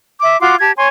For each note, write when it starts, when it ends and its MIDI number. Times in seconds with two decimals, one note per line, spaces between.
0.22 0.40 76
0.22 0.40 86
0.40 0.55 65
0.40 0.55 66
0.40 0.55 84
0.40 0.55 86
0.60 0.72 67
0.60 0.72 81
0.60 0.72 92
0.76 0.88 73
0.76 0.88 80
0.76 0.88 84